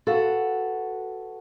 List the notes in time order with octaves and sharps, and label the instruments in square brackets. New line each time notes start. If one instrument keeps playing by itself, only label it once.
[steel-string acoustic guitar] F#4 A4 B4 F5 F#5